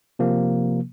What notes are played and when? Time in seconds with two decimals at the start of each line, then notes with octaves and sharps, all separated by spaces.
0.19 C3 F3 A#3